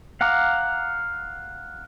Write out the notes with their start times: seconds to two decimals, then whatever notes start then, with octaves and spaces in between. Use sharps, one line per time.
0.21 F5 F#5 A#5 D6